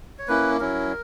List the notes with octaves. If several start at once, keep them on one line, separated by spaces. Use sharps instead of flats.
C#5
A#3 C#4 E4 B4
F#3 C#4 E4 A#4